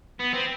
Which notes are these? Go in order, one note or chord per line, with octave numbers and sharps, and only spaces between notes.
B3
C4